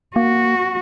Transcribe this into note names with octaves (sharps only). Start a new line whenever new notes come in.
A#3 F#4